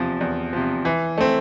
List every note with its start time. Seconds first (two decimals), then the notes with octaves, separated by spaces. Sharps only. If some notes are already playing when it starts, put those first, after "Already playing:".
Already playing: E2 C3 F3
0.21 E2
0.53 C3 F3
0.85 E3
1.18 A3 C4